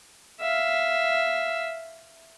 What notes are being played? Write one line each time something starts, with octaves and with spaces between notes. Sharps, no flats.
E5 F5